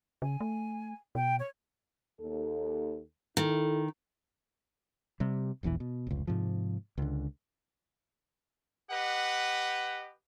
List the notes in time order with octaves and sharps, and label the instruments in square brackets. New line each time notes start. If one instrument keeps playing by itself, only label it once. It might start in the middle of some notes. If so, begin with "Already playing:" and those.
[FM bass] C#3 [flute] G#5
[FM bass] A3
[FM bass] B2 [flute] G5
[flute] C#5
[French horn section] D#2 A4
[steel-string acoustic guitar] D#3 [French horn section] E4 A4
[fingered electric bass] C3 G3
E1 A#1 E2 E3
B2
F1 C#2
G#2 C3 F3
C#2 D3
[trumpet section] G4 B4 D#5 F#5